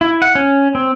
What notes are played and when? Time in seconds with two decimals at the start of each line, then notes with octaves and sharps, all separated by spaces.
0.01 E4
0.22 F#5
0.35 C#4
0.75 C4